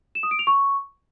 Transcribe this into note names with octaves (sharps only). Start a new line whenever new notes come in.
E7
D#6
D7
F7
C#6